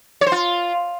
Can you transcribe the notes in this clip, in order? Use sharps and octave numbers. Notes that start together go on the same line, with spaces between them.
C#5
C5
F4